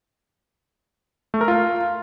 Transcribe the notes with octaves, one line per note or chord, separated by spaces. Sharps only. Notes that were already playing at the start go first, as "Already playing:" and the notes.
A3
A#4
F4